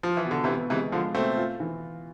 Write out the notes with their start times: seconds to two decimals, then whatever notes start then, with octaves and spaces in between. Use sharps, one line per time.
0.03 F3 F4
0.17 E3
0.25 B2
0.31 D3
0.44 C3 E3
0.48 B3
0.70 C3 E3 G#3
0.92 D3 F3 F4
1.15 B2 A3 C4
1.37 F4
1.60 E3